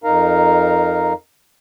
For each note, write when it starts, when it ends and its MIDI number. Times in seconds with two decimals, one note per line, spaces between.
0.04 1.13 41
0.04 1.13 63
0.04 1.13 70
0.04 1.13 77
0.04 1.13 82